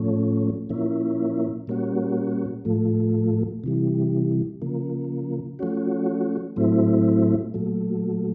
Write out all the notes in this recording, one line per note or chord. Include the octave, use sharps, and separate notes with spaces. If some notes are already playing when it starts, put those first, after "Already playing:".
Already playing: A2 F3 A3 C#4
A#2 F3 A#3 C#4 E4
A#2 G3 A#3 C#4 F#4
A2 F3 A3
C3 E3 G3
C#3 F3 A#3
F3 A3 C#4 F#4
A2 F#3 A3 C4 E4
A#2 F#3 A3